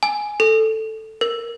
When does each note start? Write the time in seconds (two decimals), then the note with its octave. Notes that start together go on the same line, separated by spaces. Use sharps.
0.03 G#5
0.40 A4
1.21 A#4